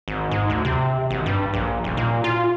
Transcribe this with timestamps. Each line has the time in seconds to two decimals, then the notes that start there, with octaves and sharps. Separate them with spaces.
0.08 G#1
0.31 G#2
0.50 D2
0.65 C3
1.11 G#1
1.26 G2
1.54 A#1
1.84 D#1
1.97 A#2
2.24 F4